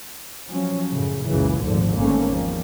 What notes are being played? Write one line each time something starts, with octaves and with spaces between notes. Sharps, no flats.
F3 F#3 C#4
F#2 A2 C#3
C#2 F#2 A#2 C#3 E3
G#1 D2 A#2 D3 F3
G#1 G#2 D3 A3 A#3 C#4
E2 F3 G3 A#3